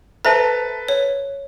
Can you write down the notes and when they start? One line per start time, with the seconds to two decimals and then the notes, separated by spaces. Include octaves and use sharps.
0.25 A4 B4 C5 E5 A5 A#5
0.88 C#5